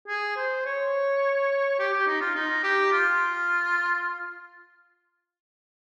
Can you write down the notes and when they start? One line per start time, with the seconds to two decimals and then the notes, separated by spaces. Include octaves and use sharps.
0.08 G#4
0.36 C5
0.65 C#5
1.79 G4
1.93 G4
2.07 D#4
2.20 F4
2.35 D#4
2.63 G4
2.92 F4